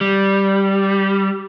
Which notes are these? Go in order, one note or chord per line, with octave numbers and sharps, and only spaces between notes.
G3